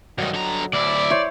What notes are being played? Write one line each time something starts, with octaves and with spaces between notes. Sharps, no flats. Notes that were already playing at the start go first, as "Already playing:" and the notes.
G2 D#3 F#3 D#5
D3 A#5
D2 E4 D5
E4 C5 C#5